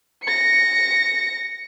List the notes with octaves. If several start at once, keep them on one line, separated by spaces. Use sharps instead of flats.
A#6 C#7